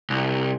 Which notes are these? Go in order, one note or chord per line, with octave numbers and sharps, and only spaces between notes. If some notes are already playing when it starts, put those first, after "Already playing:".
C2